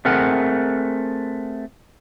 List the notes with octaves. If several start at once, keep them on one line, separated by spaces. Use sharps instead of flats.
A3 C4 G#4 A#4 F#5